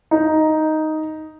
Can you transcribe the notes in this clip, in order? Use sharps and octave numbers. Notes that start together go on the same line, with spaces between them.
D#4